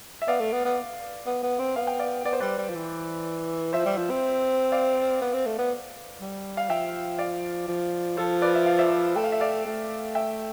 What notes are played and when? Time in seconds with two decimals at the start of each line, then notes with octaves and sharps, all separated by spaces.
0.22 E5
0.27 B3 D5 F5
0.40 A3
0.53 B3
0.65 B3
1.27 B3
1.43 B3
1.59 C4
1.76 B3 F5
1.87 G5
1.99 D5 F5
2.25 B3 D5
2.33 C5
2.40 G3 B4 D5
2.58 G3
2.69 F3
2.75 E3
3.73 F3 C5 E5
3.86 G3
3.97 F3
4.10 C4
4.72 D5 F5
5.21 B3
5.33 C4
5.46 A3
5.58 B3
6.21 G3
6.57 F5
6.69 F3 E5 G5
7.19 D5 F5
7.68 F3
8.17 F3 A4 C5
8.42 B4 D5
8.55 E5
8.66 F5
8.79 C5 E5
9.16 A3 G5
9.24 F5
9.32 E5
9.40 D5 F5
9.66 A3
10.15 E5 G5